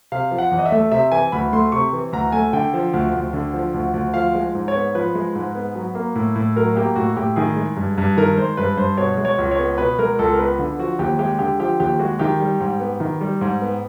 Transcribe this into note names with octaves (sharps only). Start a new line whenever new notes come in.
C3 F5
F3
F#5
E2
D#5
E5
A3
C3 E5
E3 G#5
D2 B5
A3 C6
C3 C#6
E3
D2 A#5
A3 G#5
D3 G5
F3
D2
D2
D3
F3
D2
D2
F3 F5
G#3
G#2
C#5
B3
F3 B4
G#3
G#2
B3
F#3
A#3
A2
A2
F#3 A#4
A#3 G4
A2 F#4
A2 G4
D#3 G#4
G#3
G2
G2
D#3 A#4
G#3 C5
G2 B4
G2 C5
B2 C#5
G#3
C#5
C#2
C#5
B3
B2 B4
G#3 A#4
C#2 A4
A#4
B3 B4
D3
F3 F#4
D#2 G4
G#3 G4
D3 G4
F3 G4
D#2 G4
G#3 F#4
D#3 G4
G3
G#2
B3
D#3
G3
G#2
B3